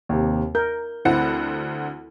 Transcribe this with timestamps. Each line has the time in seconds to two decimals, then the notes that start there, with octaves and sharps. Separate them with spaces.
0.09 D#2 C3
0.55 A#4 G6
1.05 D2 C4 E4 F#5